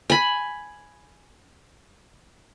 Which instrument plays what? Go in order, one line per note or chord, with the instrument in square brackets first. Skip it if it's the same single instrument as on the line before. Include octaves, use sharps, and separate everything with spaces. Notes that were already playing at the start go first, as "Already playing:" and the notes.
[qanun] G#5 B5